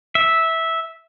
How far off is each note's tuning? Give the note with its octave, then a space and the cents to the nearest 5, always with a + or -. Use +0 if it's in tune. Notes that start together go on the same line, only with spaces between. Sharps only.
E5 -10